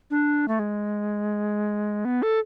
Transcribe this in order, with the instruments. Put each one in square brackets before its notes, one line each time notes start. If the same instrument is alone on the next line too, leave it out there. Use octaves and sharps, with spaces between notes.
[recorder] D4
A3
G#3
B3
A4